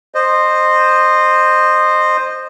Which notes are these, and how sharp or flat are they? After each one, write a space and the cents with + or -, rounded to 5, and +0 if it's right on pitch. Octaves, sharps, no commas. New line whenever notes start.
C5 +0 D#5 -20